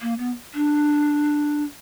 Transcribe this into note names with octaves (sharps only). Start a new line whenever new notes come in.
A#3
B3
D4